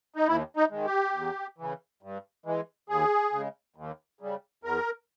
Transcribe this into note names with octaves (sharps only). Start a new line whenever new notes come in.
D#4
D#2 E4
D#4
D#3 G#3
G4
E2
C#3 E3
G2
E3 G#3
D#2 G#4
C#3 G#3
D#2
C#3 G3
E2 A#4